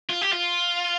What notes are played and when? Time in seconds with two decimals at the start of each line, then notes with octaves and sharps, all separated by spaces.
0.10 F4
0.22 G4
0.32 F4